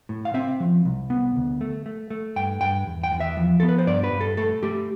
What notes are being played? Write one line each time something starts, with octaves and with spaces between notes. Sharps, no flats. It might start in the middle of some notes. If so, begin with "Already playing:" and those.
A2
F5
C4 E5
F3
C2
B3
D2
A3
A3
A3
G2 G5
G2 G5
E2
G5
E2
E5
F3
B3 A4
B4
C5
G2 D5
B4
G2
A4
A3 A4
A3 G4